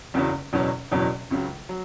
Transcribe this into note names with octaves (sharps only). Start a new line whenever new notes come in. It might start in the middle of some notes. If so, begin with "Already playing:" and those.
F#1 E2 C#3 F#3
F#1 E2 B2 F#3 C#4
F#1 E2 B2 F#3 C#4
C#2 C#3 F#3
F#3